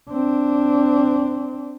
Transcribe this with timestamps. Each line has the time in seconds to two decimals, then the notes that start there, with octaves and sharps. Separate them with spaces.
0.11 C4 D4